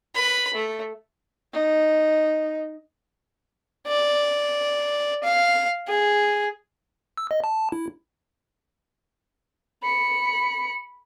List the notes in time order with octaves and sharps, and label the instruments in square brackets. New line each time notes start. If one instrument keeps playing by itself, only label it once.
[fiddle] B4 B5
A3
[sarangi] D#4
[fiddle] D5
F5
G#4
[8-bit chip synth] E6
D#5
A5
E4
[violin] B5 C#7